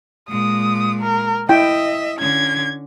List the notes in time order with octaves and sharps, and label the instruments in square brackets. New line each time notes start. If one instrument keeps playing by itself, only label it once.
[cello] A#2 G#3 [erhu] D#6
[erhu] A#4
[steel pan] E4 G5 [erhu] D#5 [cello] E5
[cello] D3 C#4 [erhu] G#6